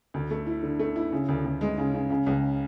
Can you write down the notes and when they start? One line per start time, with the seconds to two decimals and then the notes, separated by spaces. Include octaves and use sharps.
0.14 D2
0.31 A3
0.47 E4
0.63 D3
0.79 A3
0.96 E4
1.12 C#3
1.28 D2
1.45 D2
1.61 G#3
1.78 C#3
1.94 C#3
2.10 C#3
2.26 C#2